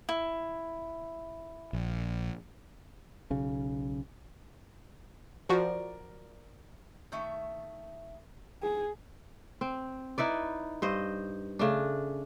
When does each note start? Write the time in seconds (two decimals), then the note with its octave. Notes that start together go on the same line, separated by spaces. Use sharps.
0.09 E4
1.73 A#1
3.30 B1 C#3
5.49 F3 F#4 A#4 D5
7.12 D#3 A3 E5
8.62 G#4
9.61 C4
10.18 D#4 E4 B4 D5
10.82 G2 C5 D#5
11.59 C#3 A3 D4